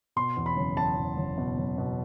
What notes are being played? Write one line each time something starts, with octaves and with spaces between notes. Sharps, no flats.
B2 C6
E2
B5
F#1
E2 A5
E2
F#1
B2
F#1
B2